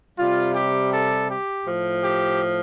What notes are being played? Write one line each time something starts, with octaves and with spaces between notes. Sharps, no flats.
C3 G3 F4
G4
A4
G4
A2 F3
G4